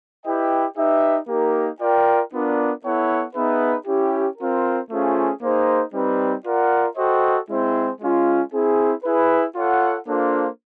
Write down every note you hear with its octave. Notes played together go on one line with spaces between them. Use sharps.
E4 G4 B4 D#5 G5
D#4 G4 B4 E5
A#3 D#4 G4 A#4
F4 A#4 D5 G5
B3 D4 F4 A#4 D5
B3 E4 A4 C#5 F#5
B3 D#4 G#4 B4 E5
C#4 E4 G4
C4 F4 A#4
A3 C#4 F4 G#4 C5
A#3 D#4 G#4 C5
G3 C4 D#4 G4 B4
F4 A#4 D5 F#5
F#4 A4 C5 D#5 G5
G#3 C4 E4 G#4 C5
G#3 C#4 F4
C4 E4 G#4
E4 G#4 B4
F4 A4 C#5 F#5
A#3 D4 F4 A4 C5